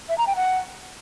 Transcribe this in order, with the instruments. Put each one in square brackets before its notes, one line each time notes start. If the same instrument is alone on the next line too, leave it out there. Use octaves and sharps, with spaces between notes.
[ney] E5
A#5
G5
F#5